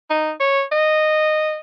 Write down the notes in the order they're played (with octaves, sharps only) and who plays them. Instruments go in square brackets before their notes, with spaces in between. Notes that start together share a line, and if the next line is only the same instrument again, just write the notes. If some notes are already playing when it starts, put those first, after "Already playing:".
[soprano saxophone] D#4
C#5
D#5